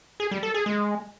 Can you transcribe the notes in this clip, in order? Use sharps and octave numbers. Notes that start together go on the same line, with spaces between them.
G#4
G3
A4
G#4
G#3